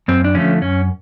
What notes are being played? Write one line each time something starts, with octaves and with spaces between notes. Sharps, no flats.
F#2 C4
D4
D3 F3 A3 C#4
F#2 C#4